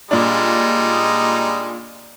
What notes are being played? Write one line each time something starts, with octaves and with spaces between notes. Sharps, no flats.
A#2 G3 G#3 D4 D#4